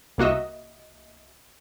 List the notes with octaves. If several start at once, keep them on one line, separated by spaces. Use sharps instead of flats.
C2 A#3 F#4 D#5 E5